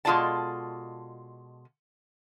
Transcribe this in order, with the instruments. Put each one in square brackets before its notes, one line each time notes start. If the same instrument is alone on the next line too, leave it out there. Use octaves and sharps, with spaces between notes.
[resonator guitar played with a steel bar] B2 G#3 F4 A4 D5 A5